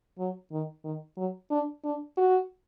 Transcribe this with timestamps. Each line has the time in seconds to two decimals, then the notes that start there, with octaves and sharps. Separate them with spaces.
0.18 F#3
0.51 D#3
0.84 D#3
1.17 F#3
1.51 D4
1.84 D4
2.17 F#4